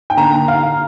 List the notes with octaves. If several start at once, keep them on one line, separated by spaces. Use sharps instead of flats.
G5
D3 A#3 D4 A#5
F5